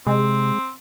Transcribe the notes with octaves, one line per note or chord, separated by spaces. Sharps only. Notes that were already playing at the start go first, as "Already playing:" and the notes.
C3 G#3 C4